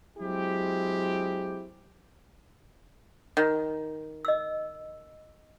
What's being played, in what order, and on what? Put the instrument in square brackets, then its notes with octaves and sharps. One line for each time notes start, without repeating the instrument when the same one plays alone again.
[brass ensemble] F#3 G#3 C4 E4 G4
[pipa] D#3
[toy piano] D#5 E6